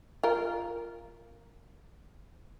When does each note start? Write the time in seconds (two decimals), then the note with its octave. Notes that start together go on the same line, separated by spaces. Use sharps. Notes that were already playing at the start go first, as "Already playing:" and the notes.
0.23 F4 A#4